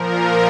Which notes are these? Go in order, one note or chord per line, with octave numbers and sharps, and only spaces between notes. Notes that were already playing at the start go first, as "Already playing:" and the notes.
Already playing: A#2 F3 A#4